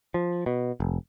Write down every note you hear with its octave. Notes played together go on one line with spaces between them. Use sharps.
F3
B2
F1